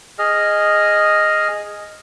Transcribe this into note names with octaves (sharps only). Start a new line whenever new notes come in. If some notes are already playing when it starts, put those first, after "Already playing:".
G#4 D#5 F6